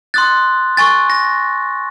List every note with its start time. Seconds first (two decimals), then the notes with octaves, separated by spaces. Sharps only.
0.14 C6 D#6 F#6 A6
0.77 G#5 C#6 F#6 A6
1.10 A#6